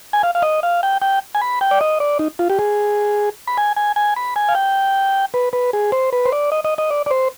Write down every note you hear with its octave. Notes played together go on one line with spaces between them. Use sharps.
G#5
F5
F5
D#5
F5
G5
G5
G#5
B5
G5
D5
D#5
D5
D#4
F4
G4
G#4
B5
G#5
G#5
G#5
B5
G#5
F5
G5
B4
B4
G#4
C5
B4
C5
D5
D#5
D#5
D#5
D5
D5
C5